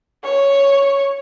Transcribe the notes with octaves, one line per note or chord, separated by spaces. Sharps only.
C#5